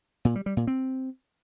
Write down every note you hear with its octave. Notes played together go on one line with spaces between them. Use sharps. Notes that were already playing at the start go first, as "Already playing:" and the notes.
A#2
G3
G3
A#2
C4